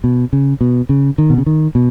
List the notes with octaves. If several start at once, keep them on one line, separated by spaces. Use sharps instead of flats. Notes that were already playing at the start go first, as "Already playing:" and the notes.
B2
C#3
B2
C#3
D#3
B2
C#3
D#3
B2